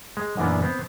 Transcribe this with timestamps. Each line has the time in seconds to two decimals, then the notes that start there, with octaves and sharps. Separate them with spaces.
0.17 G#3
0.37 F#2 A#2 E3 A#3 B3 D4
0.62 B3 C4 C5